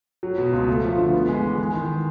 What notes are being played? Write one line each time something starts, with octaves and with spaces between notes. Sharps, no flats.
F#3
B2
C#2
A3
F3
D3
B3
G#3
E3
G#3
D#3